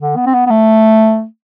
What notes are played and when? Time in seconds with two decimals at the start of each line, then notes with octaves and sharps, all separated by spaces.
0.01 D3
0.16 B3
0.26 C4
0.34 B3
0.47 B3
0.50 A3